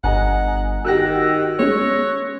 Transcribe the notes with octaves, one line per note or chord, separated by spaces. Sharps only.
G1 D#5 F#5 G#5 A#5
D#3 F#4 G4 E6 F#6 A#6
G#3 C#4 C#5